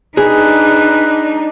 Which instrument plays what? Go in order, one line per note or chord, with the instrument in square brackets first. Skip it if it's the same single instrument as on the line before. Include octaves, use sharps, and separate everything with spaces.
[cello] D4 D#4 [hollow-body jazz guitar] G#4 [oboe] B4